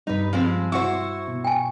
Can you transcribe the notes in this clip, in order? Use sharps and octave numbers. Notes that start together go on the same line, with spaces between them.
G2 G3 D#4 B4
F3 G#3 C4
E4 F#4 C5 C#6
B2
G5 G#5